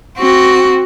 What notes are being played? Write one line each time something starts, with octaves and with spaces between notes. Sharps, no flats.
C4 F#4